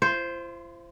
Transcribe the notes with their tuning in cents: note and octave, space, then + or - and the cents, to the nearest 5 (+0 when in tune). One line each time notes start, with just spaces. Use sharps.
F4 -45 C5 +0